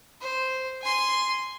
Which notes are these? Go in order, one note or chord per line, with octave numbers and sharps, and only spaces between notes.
C5
G#5 C6